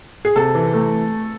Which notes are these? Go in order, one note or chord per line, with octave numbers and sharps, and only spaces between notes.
G#4
C3 A4
E3
A3